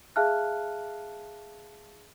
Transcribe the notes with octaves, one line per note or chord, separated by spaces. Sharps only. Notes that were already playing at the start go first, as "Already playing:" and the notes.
G#4 E5 F5 A5 F6 F#6